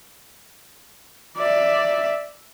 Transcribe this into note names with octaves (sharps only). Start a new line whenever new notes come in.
D5 E5